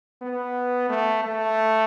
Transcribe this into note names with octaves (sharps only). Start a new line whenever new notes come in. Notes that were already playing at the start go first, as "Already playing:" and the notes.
B3
A3
A3